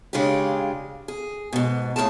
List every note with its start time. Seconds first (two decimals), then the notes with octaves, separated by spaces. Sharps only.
0.13 C#3 G#3 D4 F4 G4
1.08 G#4
1.53 G#2 B2
1.96 F2 A2 D#3 G#4 A5